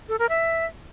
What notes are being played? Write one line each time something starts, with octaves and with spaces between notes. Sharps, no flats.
A4
A#4
E5